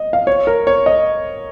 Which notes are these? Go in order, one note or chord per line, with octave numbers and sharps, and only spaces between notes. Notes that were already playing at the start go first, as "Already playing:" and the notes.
Already playing: D#5
F5
C#5
A#4
C#5
D#5